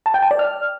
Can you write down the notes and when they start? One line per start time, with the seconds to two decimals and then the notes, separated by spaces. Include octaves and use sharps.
0.06 A5
0.14 G5
0.22 A5
0.31 D5
0.39 F6